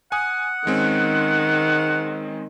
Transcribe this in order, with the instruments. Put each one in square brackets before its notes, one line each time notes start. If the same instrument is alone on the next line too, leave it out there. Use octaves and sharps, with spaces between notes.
[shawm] F#5 [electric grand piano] G#5 D#6
[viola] D#3 [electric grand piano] G#3 C4 C#4